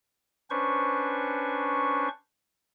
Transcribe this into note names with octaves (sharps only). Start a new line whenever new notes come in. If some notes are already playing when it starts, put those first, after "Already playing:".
C#4 D4 B4 C5 C#6